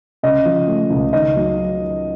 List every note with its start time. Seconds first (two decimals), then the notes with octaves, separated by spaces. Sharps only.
0.23 C#3 D#5
0.45 F3
0.68 A3
0.90 C#2
1.13 D#3 D#5
1.36 F#3